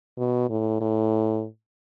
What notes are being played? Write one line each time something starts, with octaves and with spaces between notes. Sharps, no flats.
B2
A2
A2